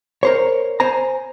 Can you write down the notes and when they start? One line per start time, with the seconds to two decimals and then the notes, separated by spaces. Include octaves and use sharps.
0.23 A#4 C5 C#5
0.80 C5 G#5 A#5